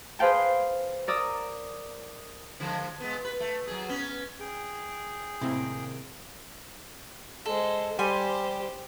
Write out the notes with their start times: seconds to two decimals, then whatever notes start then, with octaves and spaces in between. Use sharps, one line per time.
0.19 G#4 B4 C5 F5 G5 A5
1.08 A#4 D5 D#6 E6
2.60 D3 F3 G#3
3.00 G#3 B3
3.25 B4
3.40 A3
3.67 F#3 G#4
3.89 B3 C#4
4.40 G#4 G5
5.41 A2 C3 D#3 A#3 C4 E4
7.46 G#3 A4 C5
7.99 G3 G4 C5 G#5 C6